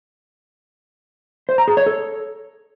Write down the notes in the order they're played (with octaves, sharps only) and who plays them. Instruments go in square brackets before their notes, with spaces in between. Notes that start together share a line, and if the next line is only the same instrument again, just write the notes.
[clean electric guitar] C5
A#5
G#4
C#5
A4